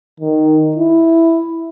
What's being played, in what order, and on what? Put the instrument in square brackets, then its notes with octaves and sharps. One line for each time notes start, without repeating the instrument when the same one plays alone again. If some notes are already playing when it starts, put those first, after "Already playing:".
[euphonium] D#3
E4